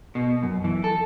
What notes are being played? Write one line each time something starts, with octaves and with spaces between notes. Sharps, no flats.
B2
F#2
E3
A4